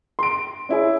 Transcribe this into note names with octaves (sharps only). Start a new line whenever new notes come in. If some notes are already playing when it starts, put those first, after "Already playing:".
C6 D7
C#4 E4 G#4